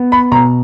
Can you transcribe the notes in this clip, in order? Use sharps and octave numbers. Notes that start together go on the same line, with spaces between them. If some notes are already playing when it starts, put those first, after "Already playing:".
Already playing: B3
B5
B2 A#5